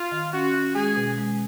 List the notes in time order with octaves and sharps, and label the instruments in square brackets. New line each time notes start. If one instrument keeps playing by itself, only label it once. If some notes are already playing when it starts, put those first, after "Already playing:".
Already playing: [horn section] F4
[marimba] D#3
[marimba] C#4 [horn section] F#4
[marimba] C#4
[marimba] G#3 [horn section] G#4
[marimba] B2
G#3